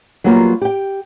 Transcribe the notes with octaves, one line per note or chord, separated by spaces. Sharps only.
F#3 G3 A#3 B3 F4
G4 G5